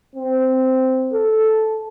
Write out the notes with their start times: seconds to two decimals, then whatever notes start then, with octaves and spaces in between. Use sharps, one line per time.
0.16 C4
1.13 A4